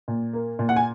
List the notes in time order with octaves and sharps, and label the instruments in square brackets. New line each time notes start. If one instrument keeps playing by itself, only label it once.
[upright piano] A#2
A#3
A#2
F#5
G#5